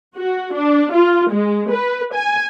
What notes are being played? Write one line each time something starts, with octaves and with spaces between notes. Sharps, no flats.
F#4
D4
F4
G#3
B4
G#5